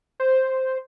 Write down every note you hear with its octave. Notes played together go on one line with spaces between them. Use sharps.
C5